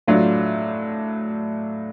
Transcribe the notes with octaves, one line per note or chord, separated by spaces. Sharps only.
A2 F#3 A3 D4 F4